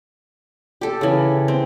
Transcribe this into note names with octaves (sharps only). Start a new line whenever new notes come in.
G4 A4
C#3 E3
C4